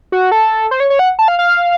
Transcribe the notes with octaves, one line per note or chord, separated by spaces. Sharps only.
F#4
A4
C5
C#5
C#5
F#5
A5
F5
F5